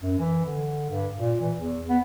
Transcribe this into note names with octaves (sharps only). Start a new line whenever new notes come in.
F#2
E3
D3
G2
A#2
E3
E2
B3